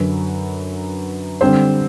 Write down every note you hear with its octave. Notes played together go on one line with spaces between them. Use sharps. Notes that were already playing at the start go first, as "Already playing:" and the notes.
Already playing: F#2 D3 F#3 B4
D3 G3 C4 C5